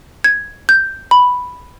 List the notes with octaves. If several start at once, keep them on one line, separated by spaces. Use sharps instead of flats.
G#6
G6
B5